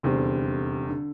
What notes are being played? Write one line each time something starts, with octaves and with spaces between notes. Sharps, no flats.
F1 E2 D3 G3 C4
D3